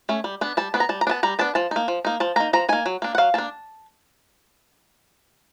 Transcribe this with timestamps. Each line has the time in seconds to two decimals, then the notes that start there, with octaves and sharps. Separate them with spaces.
0.09 A3 C#4
0.24 G3
0.41 B3 D4
0.57 G3 A5
0.74 B3 D4
0.80 A#5
0.89 G3 A5
1.01 A#5
1.07 D4
1.09 B3 A5
1.23 G3 A#5
1.39 B3 D4 A5
1.55 F3 A5
1.71 A#3 D#4
1.88 F3
2.05 A#3 D#4
2.20 F3 A5
2.36 A#3 D#4 A#5
2.53 F3 A#5
2.69 A#3 D#4 G#5
2.86 F#3
3.02 A#3 D4
3.15 F#5
3.18 F#3 F5
3.34 A#3 D4 A5